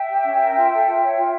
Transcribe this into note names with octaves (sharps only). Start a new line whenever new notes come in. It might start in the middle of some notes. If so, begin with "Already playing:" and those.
Already playing: E5 G5
G4
C#4
A#4
F4
A4
F4
C#5
F4